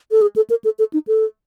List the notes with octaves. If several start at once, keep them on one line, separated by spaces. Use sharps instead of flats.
A4
G#4
A4
A#4
A4
A4
D#4
A4